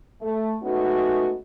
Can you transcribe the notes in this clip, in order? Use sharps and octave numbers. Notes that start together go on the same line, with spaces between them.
A3
G#3 A3 B3 C#4 D#4 F#4